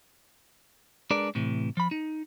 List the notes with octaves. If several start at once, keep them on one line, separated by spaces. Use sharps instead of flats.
G#3 D4 G#4 A#4 B4 D5
A2 C3 E3
F3 B5
D#4